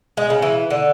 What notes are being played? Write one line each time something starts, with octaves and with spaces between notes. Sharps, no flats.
G#3
C#3
E3
D3